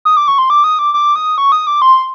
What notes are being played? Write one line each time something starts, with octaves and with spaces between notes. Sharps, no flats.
D#6
D6
C#6
C6
D6
D#6
D6
D6
D#6
C#6
D#6
D6
C6